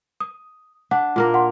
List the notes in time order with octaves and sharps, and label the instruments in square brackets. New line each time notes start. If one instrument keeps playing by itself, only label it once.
[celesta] D#6
[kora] D4 [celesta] F#5
[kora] A#2 A#3 A#4
[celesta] F#5 C6